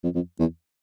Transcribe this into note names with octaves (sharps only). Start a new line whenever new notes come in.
F2
F2
E2